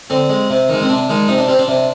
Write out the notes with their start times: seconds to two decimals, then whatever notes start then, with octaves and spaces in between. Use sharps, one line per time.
0.10 D3 C4
0.29 G#3
0.50 C3
0.69 D#3 G#3
0.82 C4
0.89 C3 D4
1.09 D#3 G#3
1.28 C3 D#4
1.38 D4
1.48 G3 C4
1.59 D4
1.68 C3